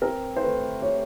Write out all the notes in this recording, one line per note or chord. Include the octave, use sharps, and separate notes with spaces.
C4 A#4
C5
A3 B4
G4 C#5